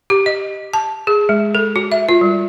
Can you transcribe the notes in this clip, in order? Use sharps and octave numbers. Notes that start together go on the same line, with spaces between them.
G4
D#5
A5
G#4
G#3
A4
F#4
E5
F4
G3